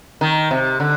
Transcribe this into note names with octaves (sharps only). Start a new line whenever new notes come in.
D#3
C3
D3